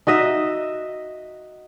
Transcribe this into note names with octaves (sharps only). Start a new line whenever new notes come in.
D#4 F#4 D#5 E5